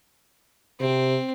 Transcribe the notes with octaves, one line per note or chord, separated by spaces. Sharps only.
C3 C4